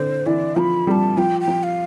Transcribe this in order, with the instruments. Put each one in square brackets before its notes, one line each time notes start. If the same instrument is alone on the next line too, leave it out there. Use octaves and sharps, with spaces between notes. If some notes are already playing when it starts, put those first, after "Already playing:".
Already playing: [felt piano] D3 [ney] C5
[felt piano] E3 [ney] D5
[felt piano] F3 [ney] B5
[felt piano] G3 [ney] B5
[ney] A5
[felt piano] F3 [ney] G5
[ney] G5
[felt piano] F3
[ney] F5